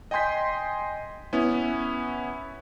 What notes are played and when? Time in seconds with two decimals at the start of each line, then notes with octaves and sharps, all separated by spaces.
0.11 D#5 G5 G#5 C6 G6 B6
1.33 B3 C#4 E4